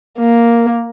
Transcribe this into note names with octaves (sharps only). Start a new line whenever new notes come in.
A#3